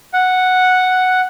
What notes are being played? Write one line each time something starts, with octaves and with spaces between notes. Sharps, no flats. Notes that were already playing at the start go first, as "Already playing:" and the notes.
F#5